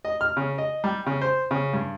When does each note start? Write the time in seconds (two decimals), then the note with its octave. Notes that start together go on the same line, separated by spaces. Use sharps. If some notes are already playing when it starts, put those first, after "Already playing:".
0.05 D#5
0.21 F6
0.37 C#3
0.58 D#5
0.84 G3
1.07 C#3
1.21 C5
1.51 C#3
1.73 G2